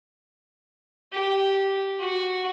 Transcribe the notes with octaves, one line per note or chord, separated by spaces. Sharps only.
G4
F#4